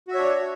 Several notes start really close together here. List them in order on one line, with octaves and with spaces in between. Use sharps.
F#4 E5 C#5 D4